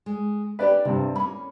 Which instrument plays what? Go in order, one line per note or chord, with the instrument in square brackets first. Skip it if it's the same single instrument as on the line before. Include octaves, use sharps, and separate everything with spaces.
[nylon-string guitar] G#3
[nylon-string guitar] C#4 D4 G4 [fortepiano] B4 D5
[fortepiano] G2 C3 [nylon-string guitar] G3
[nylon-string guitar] A#3 C#4 [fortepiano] B5